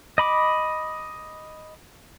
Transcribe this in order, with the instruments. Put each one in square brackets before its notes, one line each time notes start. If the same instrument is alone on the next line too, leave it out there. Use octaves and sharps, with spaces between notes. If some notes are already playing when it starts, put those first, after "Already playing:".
[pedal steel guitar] D#5 B5 D6